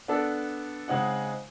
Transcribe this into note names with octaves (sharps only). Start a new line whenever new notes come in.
B3 D4 A4 D5
C#3 G#3 C4 D#4 F#5